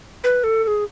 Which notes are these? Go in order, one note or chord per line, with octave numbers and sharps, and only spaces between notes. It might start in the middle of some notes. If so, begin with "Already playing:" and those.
B4
A4
A4
G#4